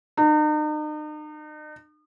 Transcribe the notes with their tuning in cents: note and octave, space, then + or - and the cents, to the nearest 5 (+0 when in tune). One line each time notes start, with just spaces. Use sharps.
D#4 -40